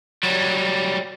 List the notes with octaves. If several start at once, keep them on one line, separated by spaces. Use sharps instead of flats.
F#3 G3